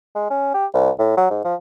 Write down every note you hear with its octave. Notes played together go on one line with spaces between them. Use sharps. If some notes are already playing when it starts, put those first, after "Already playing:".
G#3
C#4
G4
C2
A2
F#3
G#2
F3